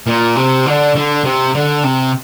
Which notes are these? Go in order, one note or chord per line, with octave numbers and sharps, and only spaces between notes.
A#2
C3
D3
D3
C3
D3
C3